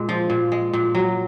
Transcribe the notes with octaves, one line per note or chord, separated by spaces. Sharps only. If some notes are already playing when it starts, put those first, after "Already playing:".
Already playing: A#2 G#3
F3
A#2
G#3
A#2
F#3